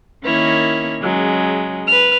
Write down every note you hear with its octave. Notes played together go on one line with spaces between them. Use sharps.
D#3 A#3 C#4 E4 C#5
C#3 F#3 G#3
B4 F6